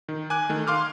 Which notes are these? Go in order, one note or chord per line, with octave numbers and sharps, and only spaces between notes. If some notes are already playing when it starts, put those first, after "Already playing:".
D#3
G#5 D6 F#6
D#3 A3
F5 C6 D6 F6